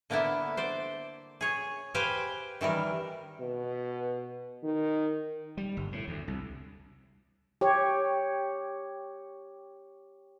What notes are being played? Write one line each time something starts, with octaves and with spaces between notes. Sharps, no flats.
D3 A#3 B3 D4 E4
C5 D5
G#4 C#5
G4 B4 C5 F5 G5 G#5
D#3 E3 G3 A#4
B2
D#3
G3
G1
A2
D2
C2
G4 C#5